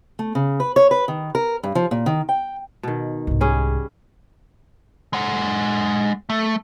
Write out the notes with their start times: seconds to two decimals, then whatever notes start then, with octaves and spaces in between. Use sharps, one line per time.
0.19 A3
0.35 C#3
0.60 B4
0.76 C#5
0.91 B4
1.08 D#3
1.35 A#4
1.63 G2
1.75 F3
1.91 A#2
2.06 D#3
2.29 G5
2.83 B2 D#3
3.27 C2 G#2
3.41 G3 C#4 G#4
5.13 G#3 F#5
6.30 A3